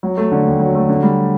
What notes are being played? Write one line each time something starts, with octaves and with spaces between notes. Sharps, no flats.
F#3
A3
D3
D#2
F#3
A3
D3
G3